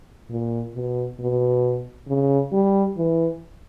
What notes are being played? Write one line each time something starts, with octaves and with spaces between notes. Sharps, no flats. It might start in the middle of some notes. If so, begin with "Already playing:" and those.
A#2
B2
B2
C#3
G3
E3